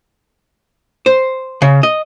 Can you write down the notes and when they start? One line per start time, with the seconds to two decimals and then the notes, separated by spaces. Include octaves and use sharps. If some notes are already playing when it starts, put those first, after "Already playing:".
1.06 C5
1.62 C#3
1.83 D#5